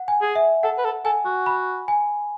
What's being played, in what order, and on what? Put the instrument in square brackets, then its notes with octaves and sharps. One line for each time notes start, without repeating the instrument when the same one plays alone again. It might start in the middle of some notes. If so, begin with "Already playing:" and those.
Already playing: [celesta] F#5
G#5
[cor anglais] G#4
[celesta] E5
[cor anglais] A4 [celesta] F#5
[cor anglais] B4
A4
[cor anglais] A4 [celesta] G#5
[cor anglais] F#4
[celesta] B5
G#5